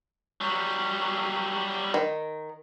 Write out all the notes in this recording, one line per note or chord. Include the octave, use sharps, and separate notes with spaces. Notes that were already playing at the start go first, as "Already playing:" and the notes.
F#3 G3
D#3